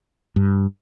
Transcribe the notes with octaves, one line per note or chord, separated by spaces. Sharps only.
G2